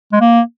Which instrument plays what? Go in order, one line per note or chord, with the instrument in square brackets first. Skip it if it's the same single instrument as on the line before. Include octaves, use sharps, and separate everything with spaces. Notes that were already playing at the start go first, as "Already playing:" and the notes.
[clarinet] G#3
A#3